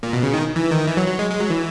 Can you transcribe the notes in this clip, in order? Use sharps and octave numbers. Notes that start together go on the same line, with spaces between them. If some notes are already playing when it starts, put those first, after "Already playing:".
A#2
B2
C#3
D#3
E3
D#3
E3
F#3
F#3
G#3
G#3
F#3
E3